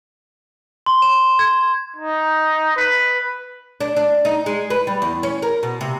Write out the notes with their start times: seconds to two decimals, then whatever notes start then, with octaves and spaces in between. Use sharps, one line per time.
0.86 C6
1.02 E7
1.39 G#6
1.96 D#4
2.76 B4
3.80 D4
3.96 D4
4.25 D#4
4.46 G#3
4.70 B4
4.87 G3
5.02 E2
5.23 C#4
5.42 A#4
5.63 B2
5.81 C3